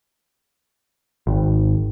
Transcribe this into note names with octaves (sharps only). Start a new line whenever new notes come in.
G#1